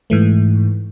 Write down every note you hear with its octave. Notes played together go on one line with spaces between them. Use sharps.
G#2 E3 A3